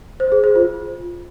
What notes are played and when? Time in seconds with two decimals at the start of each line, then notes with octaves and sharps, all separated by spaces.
0.20 C5
0.32 G#4
0.44 C5
0.56 F4